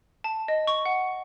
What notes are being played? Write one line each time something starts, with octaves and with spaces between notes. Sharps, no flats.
A5
D#5
C#6
F#5